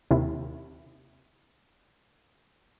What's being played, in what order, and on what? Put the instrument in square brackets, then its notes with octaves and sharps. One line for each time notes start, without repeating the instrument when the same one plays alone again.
[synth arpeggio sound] D#2 C3 E4